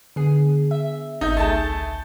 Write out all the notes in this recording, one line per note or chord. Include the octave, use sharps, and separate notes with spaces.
D3 B3 G#4
E5
G#1 D#4 E5 G6
C#2 A3 G#4 A5 G6 A6